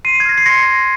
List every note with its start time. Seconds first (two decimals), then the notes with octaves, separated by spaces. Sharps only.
0.05 C6 C7 D#7
0.20 G#6
0.26 F6 A#6
0.38 C7
0.46 C6 A#6 C#7
0.67 C6